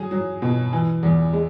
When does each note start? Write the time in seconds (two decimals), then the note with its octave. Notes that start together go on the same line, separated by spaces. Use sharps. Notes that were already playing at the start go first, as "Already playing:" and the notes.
Already playing: F#3 G#4
0.11 F#3
0.42 B2
0.73 E3
1.03 E2
1.33 G#3